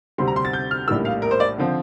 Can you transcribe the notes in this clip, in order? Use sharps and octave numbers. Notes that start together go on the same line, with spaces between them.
D2 C3 G3 C4 C6
A#5
C6
A6
G6
F6
A#1 A2 G3 A#3 E6
F5
A#4
C5
D5
D3 F3 C4